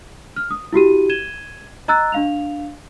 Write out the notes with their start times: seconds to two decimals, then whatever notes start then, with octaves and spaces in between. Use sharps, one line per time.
0.36 F6
0.51 D#6
0.73 E4 F#4 G4 D#7
1.09 G#6 D#7 E7 G7
1.88 D#5 A#5 E6 F#6 A6
2.12 D4 F5 F7